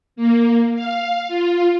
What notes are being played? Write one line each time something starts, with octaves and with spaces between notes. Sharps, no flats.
A#3
F5
F4